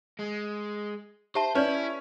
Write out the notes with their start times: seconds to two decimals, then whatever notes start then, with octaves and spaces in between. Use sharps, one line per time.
0.19 G#3
1.35 G4 C5 E5 A5
1.55 C#4 E4 B4 C#5 D5